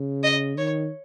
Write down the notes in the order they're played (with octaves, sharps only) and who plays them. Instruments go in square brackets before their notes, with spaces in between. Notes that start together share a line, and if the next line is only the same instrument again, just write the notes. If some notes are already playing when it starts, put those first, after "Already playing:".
Already playing: [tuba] C#3
[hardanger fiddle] D#5
[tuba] D#3 [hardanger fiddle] C#5